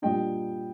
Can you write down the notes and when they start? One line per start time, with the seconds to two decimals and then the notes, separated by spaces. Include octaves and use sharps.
0.02 A#2 G3 D4 D#5 G5